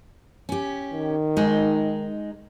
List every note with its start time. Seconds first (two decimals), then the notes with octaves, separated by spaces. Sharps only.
0.49 C#4 G4
0.92 D#3
1.37 G#3 D#4